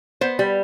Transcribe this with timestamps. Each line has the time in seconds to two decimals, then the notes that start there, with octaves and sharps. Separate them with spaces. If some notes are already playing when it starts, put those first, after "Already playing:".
0.21 B3 C5
0.39 G3